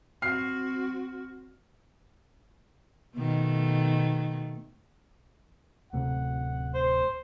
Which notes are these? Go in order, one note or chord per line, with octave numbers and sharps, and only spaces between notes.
C4 F#4 F6 C7
B2 D#3 A3
D1 C3 A3 F#5
C5